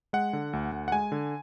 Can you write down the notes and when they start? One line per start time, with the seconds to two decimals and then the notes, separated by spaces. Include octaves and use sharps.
0.13 G#3 F#5
0.33 D3
0.53 D2
0.72 D2
0.88 F#5
0.92 G#3 G#5
1.12 D3